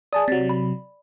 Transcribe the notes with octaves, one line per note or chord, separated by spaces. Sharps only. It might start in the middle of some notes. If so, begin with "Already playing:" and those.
G#4 D5 A5 D#6
C3 F#3 A6
B5